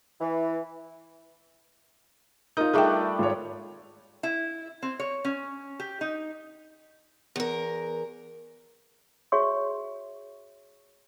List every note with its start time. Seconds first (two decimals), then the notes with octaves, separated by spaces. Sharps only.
0.20 E3
2.57 D#4 F4 A#4 D#6 G6
2.74 G3 A3 D4 G#4 E5 G5
3.19 G#2 F4 C#5
4.23 E4
4.82 C4
5.00 C#5
5.25 C#4
5.80 G4
6.01 D#4
7.36 E2 A#4
9.32 F#4 G#4 C#5 E5 C6 C#6